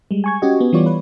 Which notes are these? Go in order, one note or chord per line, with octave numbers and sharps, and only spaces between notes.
G3 G#3
G#5 C#6 G#6
C#4 F#4 G4 D#5
B3
E3 G3 B3 F4 C#5 D5
B4